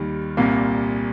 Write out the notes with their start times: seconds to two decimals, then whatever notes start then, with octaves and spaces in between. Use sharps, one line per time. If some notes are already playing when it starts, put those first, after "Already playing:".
Already playing: D#2 D#3 G3
0.37 C2 A#2 G3 A#3